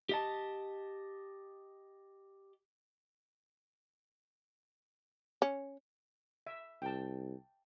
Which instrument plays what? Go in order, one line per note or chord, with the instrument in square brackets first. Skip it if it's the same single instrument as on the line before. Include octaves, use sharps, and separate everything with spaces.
[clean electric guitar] G4 D#5 A5
[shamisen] C#4
[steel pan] E5
[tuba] C2 [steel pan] G5 A5